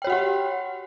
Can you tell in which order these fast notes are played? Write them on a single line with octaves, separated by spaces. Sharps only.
G5 C#5 F#4 F#5 G4